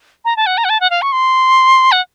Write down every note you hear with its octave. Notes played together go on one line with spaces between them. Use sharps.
A#5
A5
F#5
A#5
F#5
A5
F#5
F5
C#6
C6
F#5